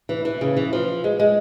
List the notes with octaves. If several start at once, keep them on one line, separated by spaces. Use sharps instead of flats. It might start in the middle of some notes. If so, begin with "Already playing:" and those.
E3
E3
C#3
E3
F3
G#3
G#3